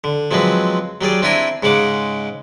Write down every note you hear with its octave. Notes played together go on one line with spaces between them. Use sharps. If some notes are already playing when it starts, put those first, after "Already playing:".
D3
F3 F#3 G#3 C4 B4
F#3 G3 G#4 D5
C4 D4 E4 G5 G#5 A#5
G#2 C#3 G#3 F#5 D6